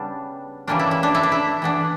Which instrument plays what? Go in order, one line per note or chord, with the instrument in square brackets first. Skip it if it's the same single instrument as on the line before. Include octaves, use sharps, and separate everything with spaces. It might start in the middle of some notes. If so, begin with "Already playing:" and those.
Already playing: [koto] C#3 G3 B3 D4
C#3 E3 G3 A#3 D4
E4
E4
D4
E4
D4
E4
E3 B3 D4